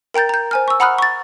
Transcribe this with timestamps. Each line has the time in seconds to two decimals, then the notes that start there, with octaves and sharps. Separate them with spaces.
0.14 A#4 G5 A#5 G6 A6
0.29 A#5 G6
0.51 C5 G#5 F6
0.68 C#6 E6
0.80 F#5 A#5 B5 D#6 F6 F#6
0.98 C#6 A6